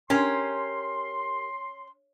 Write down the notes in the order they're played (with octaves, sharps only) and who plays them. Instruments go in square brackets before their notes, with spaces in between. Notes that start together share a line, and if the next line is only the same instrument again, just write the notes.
[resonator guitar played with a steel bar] C#4 [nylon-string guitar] G4 A#4 G#5 [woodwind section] C6